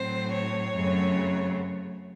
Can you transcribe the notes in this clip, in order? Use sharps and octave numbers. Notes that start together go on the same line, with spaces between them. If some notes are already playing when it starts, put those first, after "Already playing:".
Already playing: A2 F#3 C4 C5
C#5
F#2 C#3 F#3 A3 C4